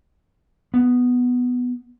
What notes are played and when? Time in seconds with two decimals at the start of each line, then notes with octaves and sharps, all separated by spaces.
0.74 B3